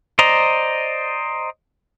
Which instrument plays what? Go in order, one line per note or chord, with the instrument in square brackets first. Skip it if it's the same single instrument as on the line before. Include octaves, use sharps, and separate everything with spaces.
[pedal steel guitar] C5 D5 D#5 A#5